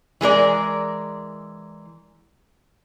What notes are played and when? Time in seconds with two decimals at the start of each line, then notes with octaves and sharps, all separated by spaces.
0.21 E3 G#3 A#4 D5